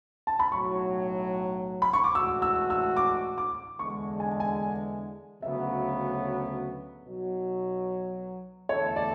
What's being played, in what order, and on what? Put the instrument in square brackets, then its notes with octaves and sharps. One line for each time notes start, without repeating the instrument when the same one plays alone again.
[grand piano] A5
B5
[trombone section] B1 A2 F#3 [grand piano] C#6
[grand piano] B5
C#6
D6
[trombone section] A2 E3 G#3 D4 F#4 [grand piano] E6
[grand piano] E6
E6
D6
D6
[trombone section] E2 D3 G#3 [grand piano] C#6
[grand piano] G#5
G#5
[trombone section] D2 C#3 F#3 B3 [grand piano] E5
[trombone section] B1 B2 F#3
[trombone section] E2 D3 A3 E4 A4 [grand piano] C#5
[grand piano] D5